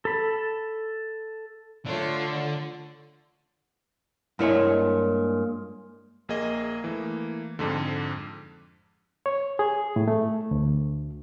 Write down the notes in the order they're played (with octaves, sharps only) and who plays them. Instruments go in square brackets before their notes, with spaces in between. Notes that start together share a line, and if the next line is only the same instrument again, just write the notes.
[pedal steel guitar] A4 B5
[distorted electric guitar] D3 D5 [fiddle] A3 C#5 [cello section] F4
[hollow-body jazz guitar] G2 E4 C#5 [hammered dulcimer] A#2 G#3
[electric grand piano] A#1 A#3 G#4 D#5
E3 A3 A#3
F2 G#2 D3
[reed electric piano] C#5
G#4
A2
A3
D2